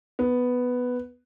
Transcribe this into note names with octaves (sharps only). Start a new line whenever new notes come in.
B3